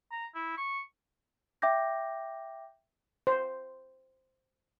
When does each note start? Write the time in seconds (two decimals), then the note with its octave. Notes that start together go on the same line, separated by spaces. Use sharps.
0.12 A#5
0.35 E4
0.58 C#6
1.62 E5 G5 D6 G6 A#6
3.27 C5